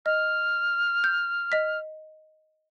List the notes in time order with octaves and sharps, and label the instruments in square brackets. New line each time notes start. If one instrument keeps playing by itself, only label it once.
[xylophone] D#5 [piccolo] F6
[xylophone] G6
D#5 B6